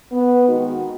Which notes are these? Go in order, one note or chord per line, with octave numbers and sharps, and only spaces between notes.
B3
D#3 G#3 D#4 F#4